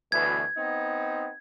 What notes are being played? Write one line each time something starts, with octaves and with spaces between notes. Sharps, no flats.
D2 B2 E3 G#6
B3 C4 D#4